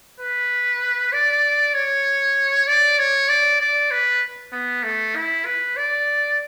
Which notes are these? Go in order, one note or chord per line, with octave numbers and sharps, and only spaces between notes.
B4
D5
C#5
D5
C#5
D5
D5
B4
B3
A3
E4
B4
D5